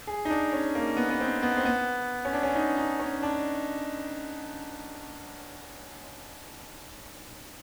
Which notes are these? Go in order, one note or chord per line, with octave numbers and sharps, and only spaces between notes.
G#4
D#4
D4
C#4
A#3
B3
B3
C4
B3
C4
B3
C#4
D4
C#4
D#4
D#4
C#4
D4